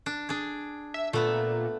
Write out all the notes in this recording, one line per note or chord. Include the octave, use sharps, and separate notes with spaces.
D4
D4 G#4
E5
A#2 A3 B3 E5